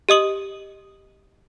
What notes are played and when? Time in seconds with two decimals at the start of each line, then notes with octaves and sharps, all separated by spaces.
0.09 G4 D#5 D#6 F#7